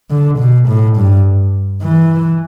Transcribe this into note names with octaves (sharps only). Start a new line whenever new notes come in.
D3
B2
A2
G2
E3